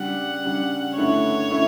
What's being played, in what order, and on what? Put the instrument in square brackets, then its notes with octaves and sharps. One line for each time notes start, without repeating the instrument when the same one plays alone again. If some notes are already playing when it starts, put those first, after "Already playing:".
Already playing: [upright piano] C#3 G3 D4 [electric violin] F#5
[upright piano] C#3 G3 D4
[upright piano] G2 D3 A3 C#4 E4 [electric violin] C#5
[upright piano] D3 A3 C#4 E4